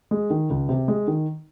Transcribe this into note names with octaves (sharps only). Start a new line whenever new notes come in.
G#3
D#3
C#2
C3
G#3
D#3